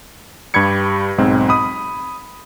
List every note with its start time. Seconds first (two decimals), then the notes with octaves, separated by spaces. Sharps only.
0.54 G2 G4 B5 G#6 C#7
1.18 B1 G#2 C4
1.49 B5 D#6